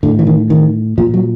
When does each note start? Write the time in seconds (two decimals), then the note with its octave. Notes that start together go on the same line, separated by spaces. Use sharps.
0.03 A2 D3
0.19 E3
0.27 D#3
0.50 D#3
0.98 A#2 F3
1.14 F#3